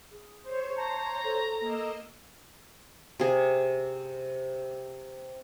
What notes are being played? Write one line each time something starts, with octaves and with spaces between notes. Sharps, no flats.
G#4
C5 C#5
A5 A#5
A4
A#3 D#5 E6
C3 G#4